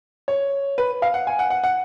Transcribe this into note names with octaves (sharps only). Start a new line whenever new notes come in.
C#5
B4
F5
F#5
G#5
F#5
F#5
F#5